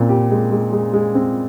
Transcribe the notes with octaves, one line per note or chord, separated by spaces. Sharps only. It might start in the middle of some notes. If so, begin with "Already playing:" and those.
Already playing: A#2 C4
G4
G#3
G#3
G#3
G#3
C4